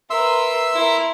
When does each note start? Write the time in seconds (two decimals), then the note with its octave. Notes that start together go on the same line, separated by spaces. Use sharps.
0.10 A#4 B4 E5 C6 E6
0.74 E4 A#4